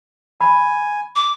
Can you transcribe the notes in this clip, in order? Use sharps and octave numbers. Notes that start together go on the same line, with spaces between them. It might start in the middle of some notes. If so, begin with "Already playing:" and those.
G#5 B5
D6